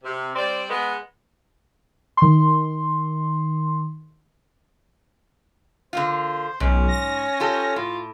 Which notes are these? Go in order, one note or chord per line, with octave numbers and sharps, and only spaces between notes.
C3
G3 C4 C5 D5
G#3 B3
D#3 C6
D3 A#3 F4 C5
B1 G#2 C#4
A#6
F4 G4 A4
A2 F4